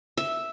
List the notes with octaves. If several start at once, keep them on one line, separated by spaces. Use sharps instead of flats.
E5